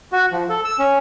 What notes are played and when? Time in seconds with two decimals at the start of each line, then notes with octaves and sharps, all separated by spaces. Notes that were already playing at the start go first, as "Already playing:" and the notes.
0.13 F#4
0.32 F3
0.50 A4
0.65 E6
0.79 C#4